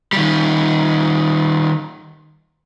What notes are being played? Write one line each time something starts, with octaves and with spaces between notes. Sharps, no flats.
D#3 G3